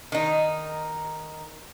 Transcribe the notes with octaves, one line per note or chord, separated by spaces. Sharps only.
D#3 D#4